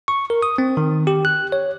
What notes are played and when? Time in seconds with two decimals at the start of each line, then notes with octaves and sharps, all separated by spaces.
0.08 C#6
0.30 A#4
0.42 D#6
0.58 C4
0.77 D#3
1.07 G4
1.25 F#6
1.52 C#5